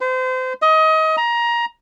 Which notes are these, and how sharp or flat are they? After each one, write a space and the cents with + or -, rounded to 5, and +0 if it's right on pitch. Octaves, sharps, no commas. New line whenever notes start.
C5 -30
D#5 +25
A#5 +20